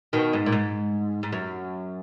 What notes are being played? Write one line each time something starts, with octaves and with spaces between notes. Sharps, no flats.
B2 D#3
G#2
A#2
G#2
G#2
F#2